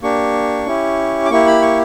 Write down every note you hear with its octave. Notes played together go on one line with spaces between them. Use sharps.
A#3 D4 G4 C#6
C#4 E4 G4
D6
A#3 E4 G4 C#6
B5
C#6